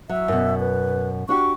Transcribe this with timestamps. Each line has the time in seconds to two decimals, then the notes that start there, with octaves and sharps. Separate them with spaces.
0.09 F#3 E5
0.28 F#2 B2
0.60 B4
1.29 D4 F#4 G4 C#6